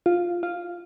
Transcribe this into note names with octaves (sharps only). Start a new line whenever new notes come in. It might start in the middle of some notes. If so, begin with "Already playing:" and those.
F4
F4